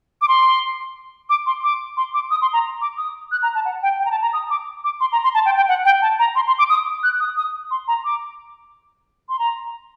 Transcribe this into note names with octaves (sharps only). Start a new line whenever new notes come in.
D6
C6
D6
C6
D6
C6
D6
D#6
C6
A#5
D6
D#6
F#6
A#5
A5
F#5
G5
G5
A#5
A5
A#5
D#6
D6
D6
C6
A#5
C6
A5
G5
G5
F#5
G5
A5
A#5
C6
C6
D6
D#6
F#6
D#6
D#6
C6
A#5
D6
C6
A#5